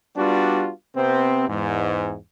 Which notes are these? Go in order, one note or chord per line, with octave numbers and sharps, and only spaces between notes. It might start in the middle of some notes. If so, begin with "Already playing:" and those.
G3 B3 D4 F4 F#4
C3 B3 C4
E2 G#2